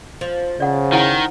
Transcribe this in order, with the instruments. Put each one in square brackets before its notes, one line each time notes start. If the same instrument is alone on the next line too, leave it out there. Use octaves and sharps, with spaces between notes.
[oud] F3
[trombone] C#3 [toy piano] D5 F#5
[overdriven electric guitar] D#3 [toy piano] E4 F#5